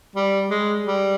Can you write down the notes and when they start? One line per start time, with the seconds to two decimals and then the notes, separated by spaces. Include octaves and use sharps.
0.16 G3
0.50 G#3
0.86 G3